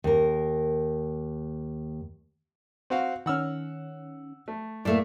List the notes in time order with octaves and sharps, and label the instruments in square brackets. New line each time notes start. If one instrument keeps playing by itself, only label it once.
[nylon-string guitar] D#2 A#4
[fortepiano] C4 F#4 F5
[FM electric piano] D#3 C#4 [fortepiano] F#5 E6 F6
[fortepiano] A3
[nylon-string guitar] A2 A3 A#3 [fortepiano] D5